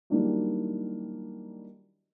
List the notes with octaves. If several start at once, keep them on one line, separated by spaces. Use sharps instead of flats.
D#3 F#3 G3 A#3 D4 E4